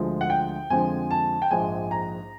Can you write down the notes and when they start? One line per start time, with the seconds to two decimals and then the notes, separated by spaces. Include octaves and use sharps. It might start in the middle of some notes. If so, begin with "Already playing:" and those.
Already playing: D2 D3 F3 G#3
0.21 F#5
0.30 G5
0.70 F2 D3 F3 G#3 G#5
1.11 A5
1.42 G5
1.51 A#1 G#2 F3 G#3 G#5
1.91 A#5